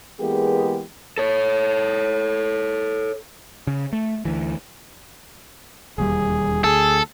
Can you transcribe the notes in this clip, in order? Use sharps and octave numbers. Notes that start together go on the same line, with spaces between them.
E3 G#3 A#3 B3 G4 G#4
A4 C#5
C#3
A3
D2 E3
E1 D#2 G3 G#4
D2 G#4 A4